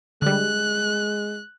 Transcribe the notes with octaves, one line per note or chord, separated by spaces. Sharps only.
D3 G3 G#3 F#6